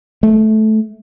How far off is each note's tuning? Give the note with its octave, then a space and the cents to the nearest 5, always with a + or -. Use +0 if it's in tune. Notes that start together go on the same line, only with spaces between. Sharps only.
A3 -15